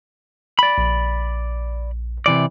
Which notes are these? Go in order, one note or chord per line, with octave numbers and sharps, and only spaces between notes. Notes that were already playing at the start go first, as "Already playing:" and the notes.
D5 B5
A#1
C3 E3 D5